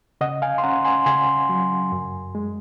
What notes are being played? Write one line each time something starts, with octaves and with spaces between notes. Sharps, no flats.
C#3 D#5 F#5
F5 G#5
C6
C#4 F#5 A#5
G#5 C6
C#3 G#5 C6
F#3
F#2
G#3